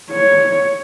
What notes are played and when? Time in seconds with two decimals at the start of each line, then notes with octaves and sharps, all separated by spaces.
0.11 C#5